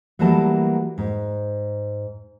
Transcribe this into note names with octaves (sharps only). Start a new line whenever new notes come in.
E3 F#3 G3 A3 A#3 A5
G#2